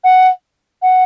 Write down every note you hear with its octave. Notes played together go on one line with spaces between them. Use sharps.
F#5
F#5